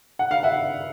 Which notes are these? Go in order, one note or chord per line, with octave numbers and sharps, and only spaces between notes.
F#5
F5
E5 F#5